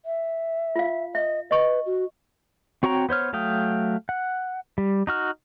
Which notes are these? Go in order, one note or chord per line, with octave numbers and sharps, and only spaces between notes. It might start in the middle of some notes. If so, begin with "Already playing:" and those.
E5
F4 F5
D#5 E5
B4 D#5 C#6
F#4
C4 F#4 C#5 G5 A#5
B3 C5 C#5 F6
F#3 A3 F5 G5 D#6
F#5
G3
D#4 F#4 F6